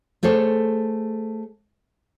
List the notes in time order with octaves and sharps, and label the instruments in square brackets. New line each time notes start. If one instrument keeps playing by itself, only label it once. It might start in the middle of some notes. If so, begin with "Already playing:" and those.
[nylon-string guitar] A3 G#4 A4 C5 C#5